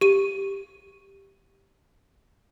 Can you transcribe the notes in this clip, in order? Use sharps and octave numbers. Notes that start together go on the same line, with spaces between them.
G4 D#7